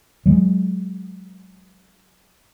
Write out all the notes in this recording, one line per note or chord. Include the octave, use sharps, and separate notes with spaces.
F#3 G#3